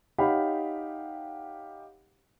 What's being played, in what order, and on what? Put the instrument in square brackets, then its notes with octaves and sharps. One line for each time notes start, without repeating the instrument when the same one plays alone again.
[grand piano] D#4 G4 C#5 F5 F#5 B5